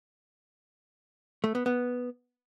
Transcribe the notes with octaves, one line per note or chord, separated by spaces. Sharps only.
A3
B3
B3